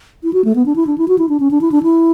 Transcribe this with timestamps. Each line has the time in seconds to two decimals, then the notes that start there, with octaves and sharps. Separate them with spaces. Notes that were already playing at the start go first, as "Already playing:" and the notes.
0.24 E4
0.33 F#4
0.45 A3
0.56 B3
0.66 D4
0.76 E4
0.87 D4
0.98 E4
1.08 F#4
1.19 E4
1.29 D4
1.40 C#4
1.51 D4
1.61 E4
1.72 D4
1.83 E4